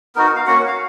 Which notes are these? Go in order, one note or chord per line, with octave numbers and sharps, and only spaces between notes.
B3 D#4 F#4 A#4
A#4
F5
A#3 C#4 F#4 F#5
F#5
F5